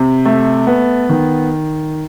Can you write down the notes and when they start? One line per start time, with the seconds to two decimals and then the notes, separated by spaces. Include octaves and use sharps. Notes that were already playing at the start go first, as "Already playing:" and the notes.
Already playing: C3
0.25 A3
0.67 B3
1.09 D#3